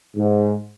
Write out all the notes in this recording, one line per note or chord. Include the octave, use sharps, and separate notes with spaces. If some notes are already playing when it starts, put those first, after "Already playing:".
G#2